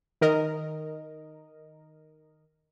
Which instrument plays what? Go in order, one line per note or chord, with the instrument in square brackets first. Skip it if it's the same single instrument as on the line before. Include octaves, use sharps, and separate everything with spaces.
[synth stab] D#3 A#4 D#5